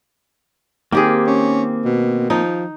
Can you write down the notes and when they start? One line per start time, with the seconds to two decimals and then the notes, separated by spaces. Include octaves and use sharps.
0.92 D#3 A#3 C4 G4 G#4
1.27 C#4
1.85 B2
2.30 F3 D#4